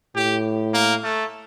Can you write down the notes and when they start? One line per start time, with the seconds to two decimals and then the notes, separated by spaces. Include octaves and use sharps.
0.16 A2 G4
0.74 A#3
1.04 A3